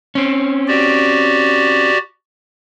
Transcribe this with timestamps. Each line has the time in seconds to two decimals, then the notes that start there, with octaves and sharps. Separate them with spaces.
0.15 C4 C#4
0.68 F#4 G4 D5